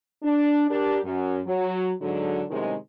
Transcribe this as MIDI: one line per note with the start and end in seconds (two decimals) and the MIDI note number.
0.22 0.64 62
0.68 0.99 62
0.68 0.99 67
0.68 0.99 70
1.04 1.39 42
1.46 1.90 54
2.01 2.41 44
2.01 2.41 50
2.01 2.41 54
2.49 2.73 42
2.49 2.73 45
2.49 2.73 48
2.49 2.73 51
2.49 2.73 56